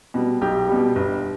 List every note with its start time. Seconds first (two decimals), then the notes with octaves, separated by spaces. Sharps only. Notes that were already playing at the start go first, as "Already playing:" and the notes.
0.14 B2 G3
0.41 B1 G4
0.68 B2 G3
0.96 G1